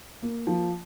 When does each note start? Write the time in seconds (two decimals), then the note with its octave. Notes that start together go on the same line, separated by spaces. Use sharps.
0.22 A#3
0.47 F3